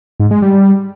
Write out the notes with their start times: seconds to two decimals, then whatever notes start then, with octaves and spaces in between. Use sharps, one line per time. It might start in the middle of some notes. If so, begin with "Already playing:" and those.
0.20 G#2
0.31 G#3
0.42 G3